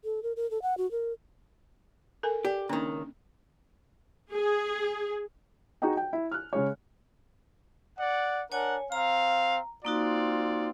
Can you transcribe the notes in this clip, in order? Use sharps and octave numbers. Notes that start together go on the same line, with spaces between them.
A4
A#4
A#4
A4
F#5
F#4
A#4
A4 A#4 G#5
G4 D5
C#2 D#3 A#3 C#4 D4
G#4
D#4 F#4 G#4 D#5 G5
G5
E4
F6 F#6
C#3 G#3 C#5
D5 F#5
D4 A#4 C#5 F#5 G#5
C4 F5 A#5
A#3 C4 D#4 F4 F#4 D5